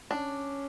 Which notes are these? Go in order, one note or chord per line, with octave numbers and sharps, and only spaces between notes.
C#4 D4